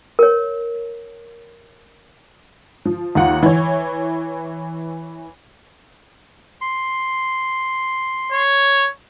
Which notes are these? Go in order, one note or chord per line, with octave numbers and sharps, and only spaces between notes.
A#4 C#5
F3
D#2 F4 F#5
E3 C#5
C6
C#5